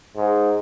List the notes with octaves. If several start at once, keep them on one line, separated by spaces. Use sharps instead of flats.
G#2